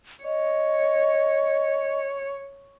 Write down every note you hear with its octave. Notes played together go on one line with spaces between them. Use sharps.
C#5 D#5